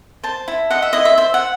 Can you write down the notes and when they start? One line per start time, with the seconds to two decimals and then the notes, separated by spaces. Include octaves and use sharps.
0.24 C5 A5
0.48 E4
0.71 D#5 F#5
0.82 E5
0.93 E4 D#5
1.05 E5
1.18 C5 E5
1.34 F#5